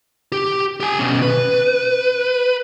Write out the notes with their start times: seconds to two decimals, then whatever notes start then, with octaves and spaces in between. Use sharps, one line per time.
0.32 G4
0.80 G4 G#5
0.99 B2 C#4
1.22 B4